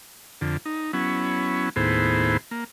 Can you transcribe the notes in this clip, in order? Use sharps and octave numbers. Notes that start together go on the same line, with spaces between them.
F2 D3
D#4
F#3 B3 C#4 E4
D#2 A2 B3 E4 G#4 C5
A#3